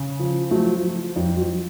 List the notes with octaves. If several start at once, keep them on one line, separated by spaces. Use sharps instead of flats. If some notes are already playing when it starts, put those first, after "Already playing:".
Already playing: C#3
F3
F3 F#3 A3
F3
F2 F3
F#3